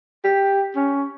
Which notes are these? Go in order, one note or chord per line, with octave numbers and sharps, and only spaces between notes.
G4
C#4